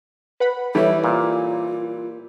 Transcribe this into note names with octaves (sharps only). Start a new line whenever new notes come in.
B4 F#5 B5
E3 G3 A4 C#5 E5
A#2 F4